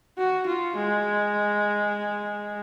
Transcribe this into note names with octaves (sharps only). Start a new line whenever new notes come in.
F#4
F4
G#3